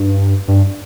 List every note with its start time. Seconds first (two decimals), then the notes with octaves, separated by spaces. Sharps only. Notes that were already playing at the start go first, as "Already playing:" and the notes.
Already playing: G2
0.48 G2